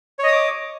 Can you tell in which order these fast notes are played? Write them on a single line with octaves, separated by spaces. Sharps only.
C#5 D#5 D#6 D6